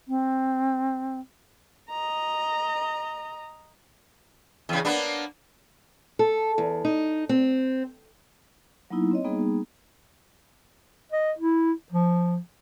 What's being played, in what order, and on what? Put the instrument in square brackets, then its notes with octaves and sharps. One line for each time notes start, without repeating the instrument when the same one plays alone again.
[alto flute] C4
[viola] D#5 A#5
[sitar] E2 C#3
A#3 B3 D4
[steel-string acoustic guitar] A4
E2
D#4
C4
[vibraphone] F#3 A#3 B3 D#4 E4
C4 C#5 D#5
G3 A#3 B3 D#4 G#4
[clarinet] D#5
E4
F3